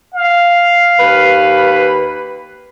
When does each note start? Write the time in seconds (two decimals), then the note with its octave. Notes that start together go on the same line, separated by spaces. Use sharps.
0.14 F5
0.99 D#2 B4